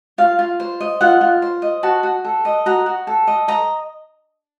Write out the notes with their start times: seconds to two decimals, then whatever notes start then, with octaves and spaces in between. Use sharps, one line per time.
0.18 F4 F5
0.39 F4
0.60 C5
0.80 D#5
1.01 F4 F#5
1.21 F4
1.42 C5
1.62 D#5
1.83 F#4 A5
2.03 F#4
2.25 A4
2.45 D#5
2.66 F#4 A#5
2.86 F#4
3.07 A4
3.27 D#5
3.48 D#5 A#5